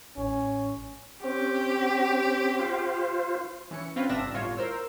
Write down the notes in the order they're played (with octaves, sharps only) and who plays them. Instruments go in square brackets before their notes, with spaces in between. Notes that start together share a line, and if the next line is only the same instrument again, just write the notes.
[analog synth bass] A1 [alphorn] C#4
[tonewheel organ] C4 C#4 [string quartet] G4
[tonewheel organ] F4 C5
[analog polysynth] E3 C#4 C#7
C4 C#4 F4 B4
G1 C3 D4 E5 A#6 E7
G1 A2 F4 C#5
A#4 C5 E6